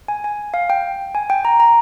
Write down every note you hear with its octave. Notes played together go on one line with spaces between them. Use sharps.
G#5
G#5
F5
G5
G#5
G5
A#5
A#5